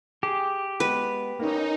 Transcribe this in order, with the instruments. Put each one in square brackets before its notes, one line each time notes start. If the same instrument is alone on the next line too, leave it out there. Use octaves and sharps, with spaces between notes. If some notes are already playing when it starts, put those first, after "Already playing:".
[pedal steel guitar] G4 [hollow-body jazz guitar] G#4
[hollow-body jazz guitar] G#3 B3 [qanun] B4
[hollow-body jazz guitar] A#3 C#4 [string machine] D#4